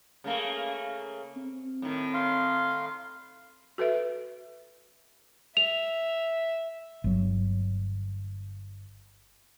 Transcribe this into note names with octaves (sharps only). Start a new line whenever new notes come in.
C#3 A3 A#3
C4
A2 D#3
F5 C6
F#4 A4 B4 E5
E5 F7
G1 F#3